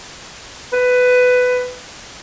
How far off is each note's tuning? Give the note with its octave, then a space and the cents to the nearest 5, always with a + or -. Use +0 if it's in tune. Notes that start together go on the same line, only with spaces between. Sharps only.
B4 +15